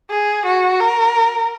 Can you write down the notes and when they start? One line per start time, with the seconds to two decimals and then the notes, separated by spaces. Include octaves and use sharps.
0.10 G#4
0.46 F#4
0.80 A#4